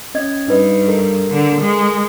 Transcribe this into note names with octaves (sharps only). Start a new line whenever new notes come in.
C#4 D#5 G#6
G2 D#4 B4 D#5
A4 A#4
D3
G#3